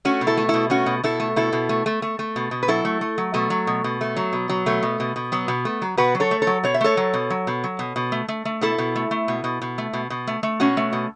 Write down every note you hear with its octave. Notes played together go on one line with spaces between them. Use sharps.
A3 C#4 F#4
B2
E4 A4
A3
B2 E4 A4
A3 C#4 F#4
B2
B2 E4 A4
A3
B2 E4 A4
B2
A3
A3
A3
A3
B2
B2
B4
F#3 E4 A4
A3
A3
F#3
B2 A3
F#3
B2
B2
A3
F#3
B2
F#3
B2 A3
B2
B2
B2
F#3 B3
B2
A3
F#3
B2 F#4 B4
F#3
A4 C#5
A3
A4 C#5
F#3
B2 C#5
E5
A3 A4 C#5
F#3
B2
F#3
B2
F#3
B2
B2
A3
A3
A3
B2 E4 A4
B2
A3
A3
B2
B2
B2
A3
B2
B2
A3
A3
B2 C#4 F#4
A3
B2